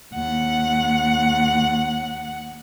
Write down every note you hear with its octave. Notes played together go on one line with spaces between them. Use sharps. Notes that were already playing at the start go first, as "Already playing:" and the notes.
D#2 F#5